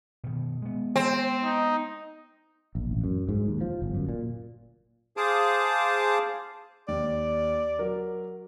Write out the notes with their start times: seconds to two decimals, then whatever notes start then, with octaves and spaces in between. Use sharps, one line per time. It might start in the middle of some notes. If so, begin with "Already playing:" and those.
0.24 B2 D#3
0.62 G#3 B3
0.96 C4
1.44 D#4
2.75 A#1
2.91 A1
3.04 F#2
3.29 G#2
3.48 D#2
3.61 F3
3.82 G1
3.95 F#2
4.09 A#2
5.17 G#4 C5 F5 A5 D6 D#6
6.88 D#2 D5
7.79 F#3 A#4